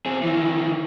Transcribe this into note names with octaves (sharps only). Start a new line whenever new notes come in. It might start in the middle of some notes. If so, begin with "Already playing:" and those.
C4 G#4
D#3 E3